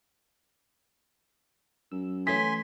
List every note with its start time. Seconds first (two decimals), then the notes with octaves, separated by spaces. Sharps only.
1.92 F#2 E6
2.27 E3 A3 C#4 G#5 C6 B6